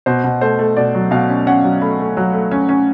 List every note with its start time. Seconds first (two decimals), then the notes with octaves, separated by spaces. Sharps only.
0.06 B2 C5
0.24 B2
0.41 A3 C5
0.59 A3
0.77 B2 D5
0.95 F#3
1.11 B2 F5
1.28 C#4
1.47 C#4 F#5
1.64 F#3
1.81 A3 B5
1.99 A3
2.17 F#3
2.33 A3
2.51 C#4
2.69 C#4